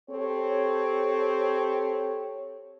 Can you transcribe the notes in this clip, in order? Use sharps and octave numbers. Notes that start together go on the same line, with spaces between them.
C4 G4 A4 C#5